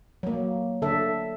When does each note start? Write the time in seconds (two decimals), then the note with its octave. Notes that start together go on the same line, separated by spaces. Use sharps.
0.23 F#3 A#3
0.82 D3 A4 E5